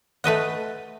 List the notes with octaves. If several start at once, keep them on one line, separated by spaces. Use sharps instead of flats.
A3 B4 D#5 F#5